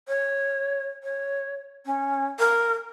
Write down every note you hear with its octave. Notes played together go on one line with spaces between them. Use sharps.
C#5
C#5
C#4
A#4